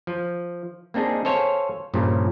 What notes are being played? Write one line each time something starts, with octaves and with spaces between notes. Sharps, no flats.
F3
A#3 C4 D4 D#4 G#4
A4 C5 C#5 F5 G#5
G2 A#2 C#3 F3